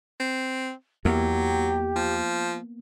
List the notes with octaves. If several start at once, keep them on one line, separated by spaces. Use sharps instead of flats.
C4
E2 F#3 A#3 B3 G4
F3